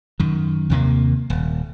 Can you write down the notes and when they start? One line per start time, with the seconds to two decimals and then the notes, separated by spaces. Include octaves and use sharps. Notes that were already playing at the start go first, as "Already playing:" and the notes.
0.20 F#2 D#3
0.70 D#2 C3 A#3
1.30 D#1